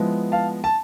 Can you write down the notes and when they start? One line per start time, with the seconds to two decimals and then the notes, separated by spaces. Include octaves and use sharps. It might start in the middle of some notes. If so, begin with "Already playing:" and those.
Already playing: F3 G#3 B3 E4
0.32 F5 A5
0.64 A5